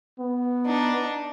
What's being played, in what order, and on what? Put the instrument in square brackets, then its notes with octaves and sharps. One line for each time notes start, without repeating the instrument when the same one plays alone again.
[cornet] B3
[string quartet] D4 D#4